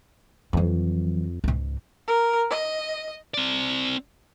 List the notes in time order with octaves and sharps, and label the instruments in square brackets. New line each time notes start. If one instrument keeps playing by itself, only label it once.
[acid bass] F2 [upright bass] E3 F#3
[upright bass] C#2 G#2
[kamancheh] A#4
D#5
[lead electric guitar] C4 D5